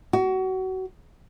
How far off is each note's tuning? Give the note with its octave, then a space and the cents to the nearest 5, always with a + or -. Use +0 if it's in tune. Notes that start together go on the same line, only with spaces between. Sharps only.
F#4 +25